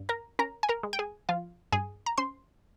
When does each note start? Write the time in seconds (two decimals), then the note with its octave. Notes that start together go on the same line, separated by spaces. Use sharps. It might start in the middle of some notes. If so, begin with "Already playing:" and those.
Already playing: G2
0.09 A#4 A#5
0.39 C#4 A#4 A#5
0.63 G#5
0.69 A#4 A#5
0.83 G#3
0.93 G5
0.99 G#4 G#5
1.29 F3 F4 F5
1.72 G2 G#4 G#5
2.06 A#5
2.18 C#4 C5 C6